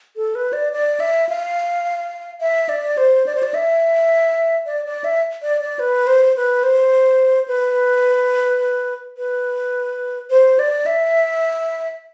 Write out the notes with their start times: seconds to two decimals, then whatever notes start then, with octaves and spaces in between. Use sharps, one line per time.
0.16 A4
0.35 B4
0.53 D5
0.73 D5
1.00 E5
1.29 F5
2.41 E5
2.69 D5
2.97 C5
3.26 D5
3.35 C5
3.43 D5
3.54 E5
4.66 D5
4.86 D5
5.04 E5
5.42 D5
5.61 D5
5.79 B4
6.07 C5
6.36 B4
6.63 C5
7.48 B4
9.17 B4
10.30 C5
10.59 D5
10.86 E5